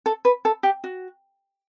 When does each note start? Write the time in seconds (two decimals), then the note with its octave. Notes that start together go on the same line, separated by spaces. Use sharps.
0.06 A4
0.25 B4
0.45 A4
0.63 G4
0.84 F#4